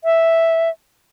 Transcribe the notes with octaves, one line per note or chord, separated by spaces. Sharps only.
E5